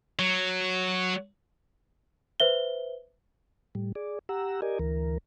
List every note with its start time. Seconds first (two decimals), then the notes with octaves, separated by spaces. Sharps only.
0.19 F#3
2.40 B4 C5 E5 G7
3.75 A2 G3
3.95 G#4 D5
4.29 G4 F#5 A#5 E6
4.62 G4 A#4 D5 D#5 G#5
4.79 D2 E3 A#4